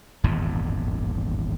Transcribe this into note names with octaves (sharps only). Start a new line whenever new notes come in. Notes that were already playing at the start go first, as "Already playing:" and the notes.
D#1 G#1 E2 G2